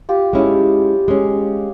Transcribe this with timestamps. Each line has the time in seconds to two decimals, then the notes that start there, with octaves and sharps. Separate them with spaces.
0.09 F4 G4
0.33 G#3 C#4 E4
1.08 G#3 C#4